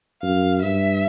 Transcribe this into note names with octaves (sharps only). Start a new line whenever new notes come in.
F#2 F5
G2 E5